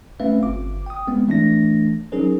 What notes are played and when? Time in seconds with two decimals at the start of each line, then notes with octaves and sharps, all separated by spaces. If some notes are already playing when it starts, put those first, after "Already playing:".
0.20 A3 C4 C#4 B4 E5 F5
0.43 G1 D6
0.86 G5 D#6
1.07 G#3 B3 C4
1.27 E3 A3 D4 A#6
2.12 F#3 C#4 D#4 G#4 A#4 C5